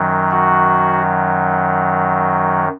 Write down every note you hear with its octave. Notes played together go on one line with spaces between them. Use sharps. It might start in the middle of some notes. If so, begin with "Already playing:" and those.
Already playing: F#2 D#3 F#3
F#4